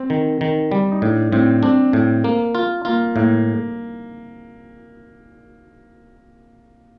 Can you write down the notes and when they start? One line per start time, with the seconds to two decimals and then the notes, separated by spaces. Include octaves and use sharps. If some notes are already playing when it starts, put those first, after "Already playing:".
Already playing: C4
0.10 D#3
0.41 D#3
0.71 G3
0.91 D#4
1.02 A2 D4
1.32 A2 C4
1.63 C4 D4
1.93 A2
2.24 A#3
2.55 F4
2.85 A#3 F4
3.16 A2 A#3